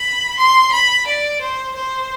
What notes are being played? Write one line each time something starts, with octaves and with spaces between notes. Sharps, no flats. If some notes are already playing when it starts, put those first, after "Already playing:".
Already playing: B5
C6
B5
D5
C5
C5